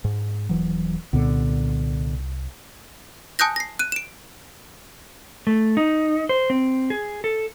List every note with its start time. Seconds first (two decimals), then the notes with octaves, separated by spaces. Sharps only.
0.04 G#2
0.49 D#1 E3 F#3
1.13 C2 A#2 D3 B3
3.39 G#5 A5 D#6 F#6 G6 A#6
3.56 A#6 C7
3.79 F#6 D#7
3.92 D7 E7
5.47 A3
5.77 D#4
6.29 C5
6.50 C4
6.90 G#4
7.24 A4